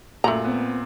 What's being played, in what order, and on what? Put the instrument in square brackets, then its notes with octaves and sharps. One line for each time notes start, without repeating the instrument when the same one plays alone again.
[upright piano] F#2 F#7 [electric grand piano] A#2 [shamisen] A3 A#5
[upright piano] B3 C4